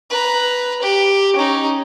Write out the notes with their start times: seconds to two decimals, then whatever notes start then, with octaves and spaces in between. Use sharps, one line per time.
0.10 B4 A#5
0.82 G4
1.36 C#4 D#4